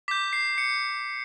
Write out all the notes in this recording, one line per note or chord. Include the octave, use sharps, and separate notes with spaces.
D6 G6 B6
C7
C#7